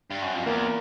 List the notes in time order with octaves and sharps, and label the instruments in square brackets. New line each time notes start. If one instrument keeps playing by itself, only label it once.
[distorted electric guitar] G2
F#2
F2
[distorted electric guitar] E2 [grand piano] A#3